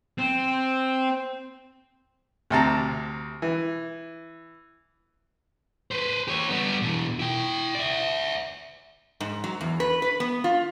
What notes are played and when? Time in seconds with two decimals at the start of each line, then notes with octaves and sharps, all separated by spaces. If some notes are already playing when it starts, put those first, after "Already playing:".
0.18 C4
2.50 D2 C3 A5 A#5
3.42 E3
5.91 B4 C5
6.28 G4 C#5
6.49 G3 B3
6.82 B2 E3
7.19 E4 G5
7.75 D5 E5
9.20 G#2
9.44 F#3
9.61 E2
9.80 B4
10.02 B4
10.20 B3
10.44 F4